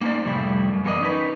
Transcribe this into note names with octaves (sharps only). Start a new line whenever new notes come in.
A#3 C#4 D#4 C5 D5
F2 A2 C3 G3 A3 E4
F#2
E3 B3 F#4 A#4 D5 D#5
C#4 D#4 B4